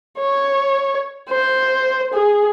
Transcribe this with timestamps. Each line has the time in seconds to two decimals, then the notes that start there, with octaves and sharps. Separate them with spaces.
0.19 C#5
1.29 C5
2.13 G#4